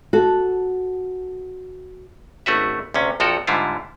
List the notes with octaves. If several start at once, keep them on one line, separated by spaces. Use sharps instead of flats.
F#4 A4
G#1 A3 C#4 F#4 B4 E5
D2 C3 C#4
A#1 F2 F3 F#4 A4 A#4
G#2 D3 G3 E4 F4